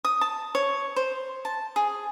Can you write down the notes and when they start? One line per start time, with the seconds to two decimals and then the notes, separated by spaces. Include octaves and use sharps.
0.05 D#6
0.21 A5
0.55 C#5
0.96 C5
1.45 A5
1.76 G#4